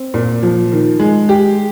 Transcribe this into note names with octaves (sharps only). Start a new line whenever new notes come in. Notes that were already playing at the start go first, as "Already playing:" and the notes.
Already playing: C4
A#2
F3
D#3
G#3
G4